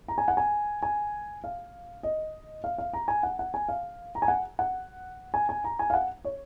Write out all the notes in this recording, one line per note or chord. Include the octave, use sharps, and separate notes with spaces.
A#5
G#5
F#5
G#5
G#5
F5
D#5
F5
F5
A#5
G#5
F#5
F#5
G#5
F5
A#5
G#5
F#5
F#5
G#5
G#5
A#5
G#5
F5
F#5
C#5